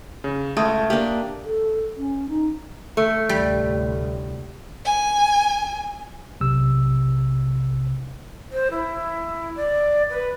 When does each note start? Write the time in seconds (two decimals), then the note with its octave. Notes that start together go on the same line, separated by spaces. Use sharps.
0.24 C#3
0.57 C#2 A3 D#6
0.90 A#3 D4 G4
1.44 A4
1.97 C#4
2.28 D#4
2.97 A3
3.29 D2 A2 C3 G3
4.85 G#5
6.40 B1 C3 E6
8.52 C5
8.71 E4
9.56 D5
10.10 B4